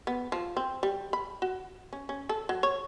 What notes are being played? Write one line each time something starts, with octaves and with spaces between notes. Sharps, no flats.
B3
F3
C4
G3
B5
F#4
C#4
C#4
A4
F#3
C#5